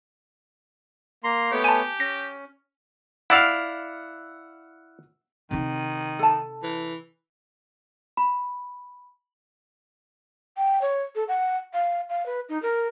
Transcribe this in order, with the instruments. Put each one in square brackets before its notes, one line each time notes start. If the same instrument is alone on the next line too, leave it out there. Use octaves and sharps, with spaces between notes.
[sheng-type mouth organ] A#3 A#5 C6
[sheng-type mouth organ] A3 B3 C#5 [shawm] G4
[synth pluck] G#5 A5
[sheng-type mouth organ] C#4 [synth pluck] A#6
[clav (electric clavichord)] E4 D5 F5 [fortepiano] F#5 E6 F6
[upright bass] C3 D#4 [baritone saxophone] D#3
[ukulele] A4 A5
[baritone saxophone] E3
[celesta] B5
[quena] G5
C#5
A4
F#5
F5
F5
B4
D#4
A#4